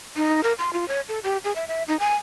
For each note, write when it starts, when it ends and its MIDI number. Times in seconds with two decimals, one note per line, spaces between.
0.16 0.43 63
0.43 0.53 70
0.59 0.73 84
0.73 0.87 65
0.88 1.01 73
1.09 1.19 69
1.24 1.37 67
1.44 1.53 68
1.56 1.65 76
1.68 1.83 76
1.88 1.99 63
1.99 2.15 80